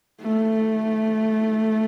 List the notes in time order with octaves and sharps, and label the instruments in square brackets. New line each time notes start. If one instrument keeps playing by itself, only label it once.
[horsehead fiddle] A3